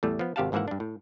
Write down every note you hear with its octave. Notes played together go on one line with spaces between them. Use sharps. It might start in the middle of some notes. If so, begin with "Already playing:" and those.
E2 A2 G3 A3
F3 B3
G#1 C3 G4 F5 F#5 A5
G#1 G#2 E3 A#3 E5 F#5
G2 D4
A2